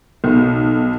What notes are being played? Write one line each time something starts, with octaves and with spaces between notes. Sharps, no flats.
B1